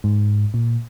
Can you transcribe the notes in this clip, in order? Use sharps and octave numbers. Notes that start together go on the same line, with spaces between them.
G#2
A#2